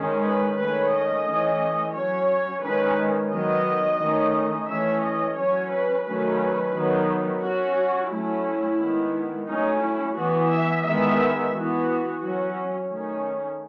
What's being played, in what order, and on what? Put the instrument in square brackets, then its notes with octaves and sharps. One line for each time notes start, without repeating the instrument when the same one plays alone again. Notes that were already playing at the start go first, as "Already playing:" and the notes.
Already playing: [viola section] D#3 G#3 C#4
B4
D#3 A3 C#4 B4
D#5
E3 A3 C#4
F#3 C#4 C#5
D#3 G#3 C#4 B4
D#3 F#3 B3 D#5
D#3 A3 C#4
E3 A3 C#4 E5
D#5
F#3 C#4 C#5
B4
D#3 F#3 A3 C#4 B4
D#3 F#3 B3
F#3 C#4 F#4
F#3 A3 C#4 E4
D#3 G#3 B3
F#3 A3 C#4 D#4
E4
E3 B3 F#4
E5
D#3 G#3 B3 E5
E3 B3 F#4
F#3 C#4 F#4
D#3 A3 C#4